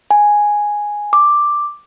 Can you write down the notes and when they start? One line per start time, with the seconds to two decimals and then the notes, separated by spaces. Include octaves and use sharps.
0.11 G#5
1.13 D6